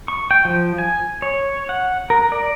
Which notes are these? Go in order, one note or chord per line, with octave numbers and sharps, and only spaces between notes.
C#6
G5
F3
G#5
C#5
F#5
A#4
D5